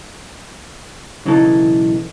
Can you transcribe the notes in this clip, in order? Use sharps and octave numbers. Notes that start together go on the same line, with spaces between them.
B1 C#3 E3 D#4 A4